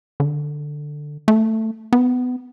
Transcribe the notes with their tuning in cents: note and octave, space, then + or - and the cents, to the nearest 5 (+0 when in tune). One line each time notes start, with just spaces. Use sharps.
D3 +10
A3 +10
B3 +20